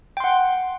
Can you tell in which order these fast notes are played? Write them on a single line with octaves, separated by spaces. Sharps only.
G5 C6 F#5